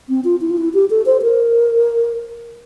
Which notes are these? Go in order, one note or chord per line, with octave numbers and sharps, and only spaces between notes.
C4
F4
E4
F4
E4
G4
A4
C5
A#4